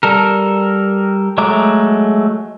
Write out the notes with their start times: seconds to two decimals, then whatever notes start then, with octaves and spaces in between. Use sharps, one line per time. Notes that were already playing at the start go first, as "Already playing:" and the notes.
0.03 G3 A4 A#4
1.38 F#3 G#3 A3 A#5 D6